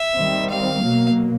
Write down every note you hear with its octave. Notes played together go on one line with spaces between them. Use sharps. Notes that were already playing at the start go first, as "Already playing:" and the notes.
Already playing: E5
D#3 G3 C4
F5
B2 F#3 A#3